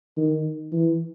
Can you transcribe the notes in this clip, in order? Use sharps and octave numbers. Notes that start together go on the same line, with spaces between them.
D#3
E3